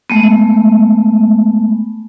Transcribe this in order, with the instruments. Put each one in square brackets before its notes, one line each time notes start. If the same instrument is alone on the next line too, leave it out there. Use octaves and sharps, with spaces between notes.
[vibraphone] G#3 A3 B3